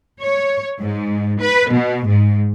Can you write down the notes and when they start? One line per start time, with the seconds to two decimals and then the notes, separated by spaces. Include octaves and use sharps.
0.21 C#5
0.80 G#2
1.42 B4
1.72 B2
2.09 G#2